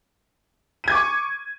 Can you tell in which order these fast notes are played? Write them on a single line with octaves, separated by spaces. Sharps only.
D#7 G#6 D6 C#6